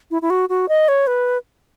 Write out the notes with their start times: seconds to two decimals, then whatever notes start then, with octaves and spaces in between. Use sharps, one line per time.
0.11 E4
0.22 E4
0.30 F#4
0.49 F#4
0.69 D#5
0.88 C#5
1.07 B4